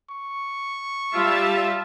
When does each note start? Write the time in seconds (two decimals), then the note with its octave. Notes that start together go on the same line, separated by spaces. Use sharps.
0.10 C#6
1.14 G3 F4 E5 A5